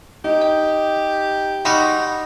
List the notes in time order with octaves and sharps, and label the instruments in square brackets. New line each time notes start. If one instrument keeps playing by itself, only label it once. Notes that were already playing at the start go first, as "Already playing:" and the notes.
[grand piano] D#4 [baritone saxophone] G4
[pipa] G5
[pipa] G3 G#3 F#4 [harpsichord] D#4